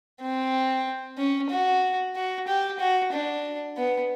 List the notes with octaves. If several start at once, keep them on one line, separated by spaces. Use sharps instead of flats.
C4
C#4
F#4
F#4
G4
F#4
D4
B3